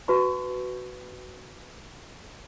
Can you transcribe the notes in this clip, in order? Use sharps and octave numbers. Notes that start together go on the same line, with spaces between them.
F#4 B4 A5 C#6